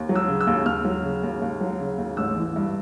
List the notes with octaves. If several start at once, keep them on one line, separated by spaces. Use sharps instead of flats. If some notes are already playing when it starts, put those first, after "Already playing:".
Already playing: D#2
F#3
E6
C#3
E6
D#2
D#2 F6
F#3
C#3
D#2
D#2
F#3
C#3
D#2
A1 E6
E3
G2